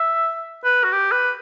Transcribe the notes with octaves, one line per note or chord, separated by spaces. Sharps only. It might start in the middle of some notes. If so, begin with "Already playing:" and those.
Already playing: E5
B4
F#4
G4
B4